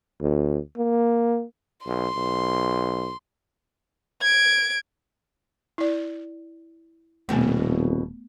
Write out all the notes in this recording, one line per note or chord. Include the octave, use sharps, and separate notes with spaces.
D2
A#3
B1 C6
B1
G#6 D7
E4 D5
D#1 F2 B2 A3 B3